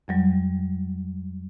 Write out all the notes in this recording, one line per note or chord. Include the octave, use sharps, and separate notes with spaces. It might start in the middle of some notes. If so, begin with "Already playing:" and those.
F2 F#3 G3